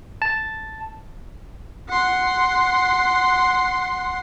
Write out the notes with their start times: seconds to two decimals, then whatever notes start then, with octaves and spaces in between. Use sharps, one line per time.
0.22 A5
1.89 F#5 C6